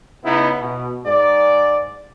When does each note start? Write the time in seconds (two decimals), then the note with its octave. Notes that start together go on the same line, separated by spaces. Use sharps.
0.24 C#3 B3 D#4 E4
0.59 B2
1.05 G#2 D5